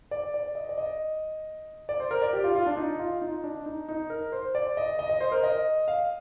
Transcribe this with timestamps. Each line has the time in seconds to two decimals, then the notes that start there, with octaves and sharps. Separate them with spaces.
0.11 D5
0.34 D5
0.55 D#5
0.69 D5
0.78 D#5
1.89 D5
2.00 C5
2.11 A#4
2.22 D5
2.33 G4
2.44 F4
2.55 F4
2.66 D4
2.77 D#4
2.99 F4
3.21 D#4
3.44 D4
3.66 D#4
3.89 D#4
4.10 A#4
4.32 C5
4.55 D5
4.77 D#5
4.99 D#5
5.10 D#5
5.21 C5
5.32 A#4
5.43 D#5
5.88 F5